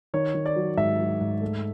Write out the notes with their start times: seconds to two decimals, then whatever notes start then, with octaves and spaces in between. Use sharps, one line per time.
0.14 D#3 C#5
0.34 D#3
0.46 D5
0.56 F#3
0.77 G#2 E5
0.99 F#3
1.21 G#2
1.42 A3